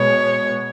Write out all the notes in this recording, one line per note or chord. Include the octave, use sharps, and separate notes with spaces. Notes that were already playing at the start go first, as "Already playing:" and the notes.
Already playing: B2 G#3 B3 C#5